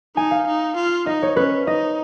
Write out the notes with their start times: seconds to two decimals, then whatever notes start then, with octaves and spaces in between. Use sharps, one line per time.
0.16 D#4 G#5
0.31 F5
0.47 D#4
0.76 F4
1.07 D#4 D#5
1.23 C#5
1.36 C#4 B4
1.67 D#4 D#5